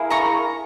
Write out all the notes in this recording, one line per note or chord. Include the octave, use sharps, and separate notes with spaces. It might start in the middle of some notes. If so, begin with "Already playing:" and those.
Already playing: A#3 E4 G#4
A#5 C#6